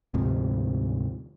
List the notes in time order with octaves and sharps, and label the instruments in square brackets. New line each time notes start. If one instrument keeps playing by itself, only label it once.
[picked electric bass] D2 G#2 C3 F3